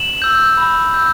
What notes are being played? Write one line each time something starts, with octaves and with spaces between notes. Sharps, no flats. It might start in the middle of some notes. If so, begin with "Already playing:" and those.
Already playing: E7 F#7
E6 G6
B5
E6 G6